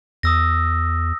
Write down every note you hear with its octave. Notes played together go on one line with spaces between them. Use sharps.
E2 D#6 E6 A#6